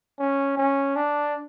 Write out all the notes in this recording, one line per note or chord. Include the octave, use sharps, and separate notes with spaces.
C#4
C#4
D4